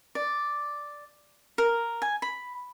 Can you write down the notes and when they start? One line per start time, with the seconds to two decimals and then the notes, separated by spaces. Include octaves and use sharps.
0.15 D5
1.58 A#4
2.02 G#5
2.22 B5